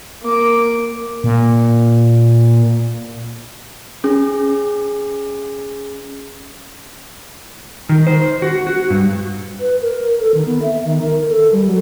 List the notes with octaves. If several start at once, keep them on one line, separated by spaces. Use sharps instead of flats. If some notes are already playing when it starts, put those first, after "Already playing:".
A#3 D6
A#2
C#4 G#4
D#3
C5
F#4
F#4
G2
B4
A#4
A4
D#3
B3
E5
D#3
A#4
A#4
A4
G3
F#3